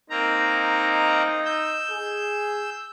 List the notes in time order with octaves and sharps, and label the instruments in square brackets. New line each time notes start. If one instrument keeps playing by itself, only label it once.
[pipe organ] A#3 C4 A#5 [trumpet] D#4
[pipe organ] E6 G6
[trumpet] G#4